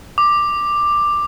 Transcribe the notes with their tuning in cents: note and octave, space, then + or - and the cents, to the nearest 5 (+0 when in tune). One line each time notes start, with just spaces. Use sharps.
D6 +10